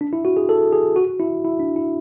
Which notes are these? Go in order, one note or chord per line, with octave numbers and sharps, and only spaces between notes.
D4
E4
F#4
G#4
A4
G#4
F#4
E4
E4
D4
E4